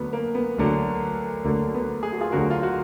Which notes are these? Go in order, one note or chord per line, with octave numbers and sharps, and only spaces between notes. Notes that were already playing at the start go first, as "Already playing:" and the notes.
Already playing: D2 D3 F#3 B3
A#3
B3
D2 D3 F#3
D2 D3 F#3 A#3
B3
G#4
F#4
F4 G#4
D2 D3 F#3 F#4 A#4
F4
F#4